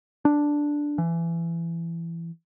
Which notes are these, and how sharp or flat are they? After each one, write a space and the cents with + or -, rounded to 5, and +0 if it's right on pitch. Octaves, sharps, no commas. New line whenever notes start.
D4 +0
E3 +25